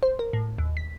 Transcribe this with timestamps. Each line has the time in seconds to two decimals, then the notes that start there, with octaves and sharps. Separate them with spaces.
0.03 C5
0.19 A#4
0.33 A2
0.58 D#2
0.77 B6